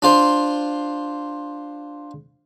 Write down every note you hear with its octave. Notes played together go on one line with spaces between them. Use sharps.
D4 F4 C5